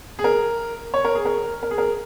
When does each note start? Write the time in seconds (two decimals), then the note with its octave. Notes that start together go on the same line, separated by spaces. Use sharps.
0.19 G#4
0.24 A#4
0.94 C#5
1.05 A#4
1.15 G#4
1.25 A#4
1.63 A#4
1.71 G#4
1.78 A#4